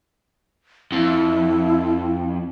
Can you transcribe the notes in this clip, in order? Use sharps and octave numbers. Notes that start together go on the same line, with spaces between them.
F2 E4